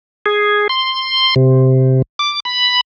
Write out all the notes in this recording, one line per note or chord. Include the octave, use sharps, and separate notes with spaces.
G#4
C6
C3
D6
B5